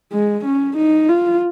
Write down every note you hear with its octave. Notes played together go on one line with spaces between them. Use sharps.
G#3
C#4
D#4
F4